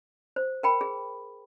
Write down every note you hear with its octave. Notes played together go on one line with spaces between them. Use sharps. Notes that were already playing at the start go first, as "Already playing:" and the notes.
C5
A#4 G5 B5
G#4